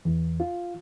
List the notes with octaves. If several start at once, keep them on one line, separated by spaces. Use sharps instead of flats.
E2
F4